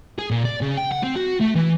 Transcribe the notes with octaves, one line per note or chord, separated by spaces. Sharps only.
G#4
A#2
D5
C#3
G5
F#5
C4
F#4
A3
E3